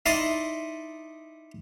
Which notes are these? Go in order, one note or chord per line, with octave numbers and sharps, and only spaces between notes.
D#4 E4 D5 D#5 C6